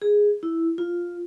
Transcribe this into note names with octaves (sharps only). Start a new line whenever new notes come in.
G#4
E4
F4